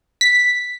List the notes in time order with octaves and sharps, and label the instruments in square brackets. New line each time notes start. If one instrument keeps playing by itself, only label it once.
[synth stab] B6